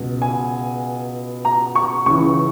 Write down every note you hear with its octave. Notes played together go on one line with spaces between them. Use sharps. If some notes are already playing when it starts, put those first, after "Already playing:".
Already playing: C#2 B2
G#5
A#5
C#6
C#2 C#3 E3 C#6